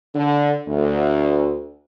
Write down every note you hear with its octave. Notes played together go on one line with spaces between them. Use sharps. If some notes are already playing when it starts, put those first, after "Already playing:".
D3
D2